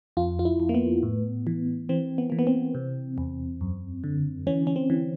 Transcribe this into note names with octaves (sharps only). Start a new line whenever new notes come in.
F2 F4
F4
E4
F2
A#3
B3
A2
E3
E3 C4
B3
E3 A#3
B3
C4
C3
E2
F#2
D3
E3 C#4
C#4
C4
E3